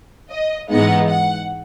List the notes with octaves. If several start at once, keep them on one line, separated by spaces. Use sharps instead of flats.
D#5
G#2 E3 G#3 B3 D#4 F#5
F#5